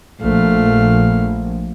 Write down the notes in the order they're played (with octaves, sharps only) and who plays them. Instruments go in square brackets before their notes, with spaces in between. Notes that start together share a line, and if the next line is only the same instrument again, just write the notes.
[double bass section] A#1 [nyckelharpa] A3 F5